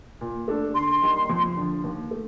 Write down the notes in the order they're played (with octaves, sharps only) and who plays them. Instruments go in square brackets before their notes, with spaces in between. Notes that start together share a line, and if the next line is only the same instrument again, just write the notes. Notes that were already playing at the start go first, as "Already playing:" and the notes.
[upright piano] A#2
A3 D4 A4
[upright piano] D3 [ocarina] C6
[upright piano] G3 A#3 D#4
F2
D3 F3
D#2
A3